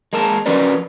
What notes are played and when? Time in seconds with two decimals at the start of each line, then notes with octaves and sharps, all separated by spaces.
0.13 G#3 A#3 A#4 A5
0.46 F3 C#4 F#4 A#4 B4 D5